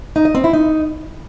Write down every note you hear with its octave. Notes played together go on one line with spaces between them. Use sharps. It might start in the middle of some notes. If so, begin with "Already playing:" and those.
D#4
D#5
C4
E4
D#4